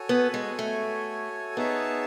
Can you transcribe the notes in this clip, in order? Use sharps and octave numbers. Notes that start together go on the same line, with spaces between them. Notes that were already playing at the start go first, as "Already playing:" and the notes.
Already playing: F#4 A4 C#5 G#5
B3
G#3
A3
B3 D#4 G#4 C#5 E5 A5